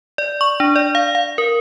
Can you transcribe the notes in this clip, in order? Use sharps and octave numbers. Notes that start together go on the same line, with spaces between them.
D5
C#6
D4
D5
F5
F5
A#4